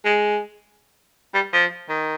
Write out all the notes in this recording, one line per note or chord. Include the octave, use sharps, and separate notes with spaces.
G#3
G3
F3
D#3